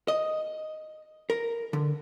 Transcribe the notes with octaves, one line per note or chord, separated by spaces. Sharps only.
D#5
A#4
D3